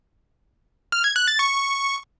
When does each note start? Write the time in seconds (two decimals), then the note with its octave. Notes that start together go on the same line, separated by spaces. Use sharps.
0.92 F6
1.04 G#6
1.16 F#6
1.28 A6
1.39 C#6